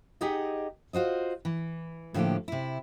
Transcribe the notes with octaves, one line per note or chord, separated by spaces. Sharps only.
D#4 G4 G#4 D#5 F#5
F4 F#4 C5 D#5
E3
A2 D3 F3 A3 A#3 G4
C3 E4